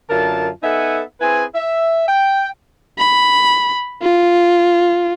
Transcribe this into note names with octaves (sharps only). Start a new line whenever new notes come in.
F#2 D3 F4 A#4 A5
B3 D#4 A4 E5 F#5 G#5
C4 E4 G#4 B4 G#5
E5
G5
B5
F4